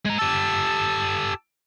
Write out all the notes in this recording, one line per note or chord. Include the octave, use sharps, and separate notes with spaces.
G#3 A#5
G4 A4 A5 E6